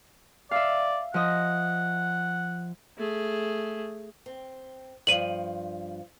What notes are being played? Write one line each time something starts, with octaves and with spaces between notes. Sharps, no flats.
D5 E5 F5
F3 D#5 F#5
A3 G#4
C4
G2 F3 D#7 F#7